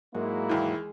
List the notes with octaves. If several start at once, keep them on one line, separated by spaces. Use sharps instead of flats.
G#2 F#3 G#3 A#3 E4
D#2 E3